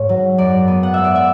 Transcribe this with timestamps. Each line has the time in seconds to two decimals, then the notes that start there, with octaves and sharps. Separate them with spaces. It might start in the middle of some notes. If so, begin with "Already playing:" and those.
Already playing: G#2 C#5
0.09 F#3
0.38 F#2 D5
0.68 B3
0.83 F#5
0.94 G#3 E5
1.04 D5
1.15 E5